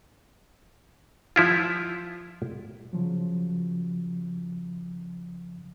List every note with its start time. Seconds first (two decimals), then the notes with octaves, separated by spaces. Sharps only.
1.36 F3 E4 F4
2.93 C#3 F3 F#3